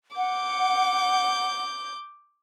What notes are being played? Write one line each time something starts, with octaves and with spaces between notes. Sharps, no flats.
F#5 D6 G6